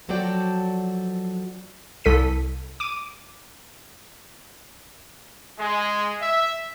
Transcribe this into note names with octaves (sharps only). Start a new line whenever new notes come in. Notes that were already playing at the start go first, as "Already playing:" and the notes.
F3 F#3 F#4 A4 D5 G5
C2 A4 B6 D#7
D6 D#7
G#3
E5